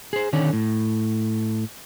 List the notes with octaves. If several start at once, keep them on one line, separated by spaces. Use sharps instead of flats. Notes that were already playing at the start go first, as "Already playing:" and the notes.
G#4 C5
D3 D#3 C#4 C#5 D5
A2